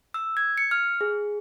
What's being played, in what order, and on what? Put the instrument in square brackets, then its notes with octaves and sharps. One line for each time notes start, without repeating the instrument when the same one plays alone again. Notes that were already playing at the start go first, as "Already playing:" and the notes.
[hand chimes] E6
G#6
C#7
F6
G#4